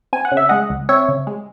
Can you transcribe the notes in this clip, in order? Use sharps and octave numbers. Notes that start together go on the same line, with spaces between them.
C4 G#5
F#5
C#3
E5
G#3 D#5 F#5
C#2
C4 C#5 E5
C#3
G#3